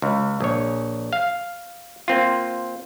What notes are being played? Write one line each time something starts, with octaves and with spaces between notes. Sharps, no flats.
C#2
A#1 C#5
F5
A#3 C4 F4